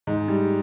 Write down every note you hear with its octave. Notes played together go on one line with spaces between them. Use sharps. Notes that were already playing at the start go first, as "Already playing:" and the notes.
G#2
G3